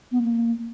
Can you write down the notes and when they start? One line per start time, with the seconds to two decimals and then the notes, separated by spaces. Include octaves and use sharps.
0.12 B3
0.22 A#3